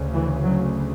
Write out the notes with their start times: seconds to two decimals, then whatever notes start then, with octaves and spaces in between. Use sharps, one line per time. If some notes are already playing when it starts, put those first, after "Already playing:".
Already playing: D2 C#3
0.14 E3
0.43 F#3